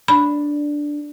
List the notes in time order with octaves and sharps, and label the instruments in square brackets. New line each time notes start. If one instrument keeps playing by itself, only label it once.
[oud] D4 [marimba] B5